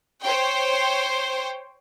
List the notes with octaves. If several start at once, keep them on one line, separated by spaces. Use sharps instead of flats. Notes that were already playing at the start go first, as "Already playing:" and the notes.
C5 C#5 G5